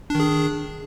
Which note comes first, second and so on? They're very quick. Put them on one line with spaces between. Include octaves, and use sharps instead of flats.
D4 D#3 G#4